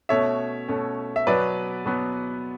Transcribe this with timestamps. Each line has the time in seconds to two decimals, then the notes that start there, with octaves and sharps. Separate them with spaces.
0.09 B2 A3 C#4 C#5 E5
0.68 B2 A3 C#4
1.16 E5
1.27 B2 F#3 B3 B4 D5
1.86 B2 F#3 B3